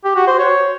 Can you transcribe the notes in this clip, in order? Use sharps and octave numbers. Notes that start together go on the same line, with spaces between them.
G4
F#4
C5
C#5